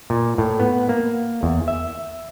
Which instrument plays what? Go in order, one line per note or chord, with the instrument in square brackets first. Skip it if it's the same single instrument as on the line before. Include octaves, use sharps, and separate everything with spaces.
[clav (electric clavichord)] A#2
A2
B3
A#3
E2
E5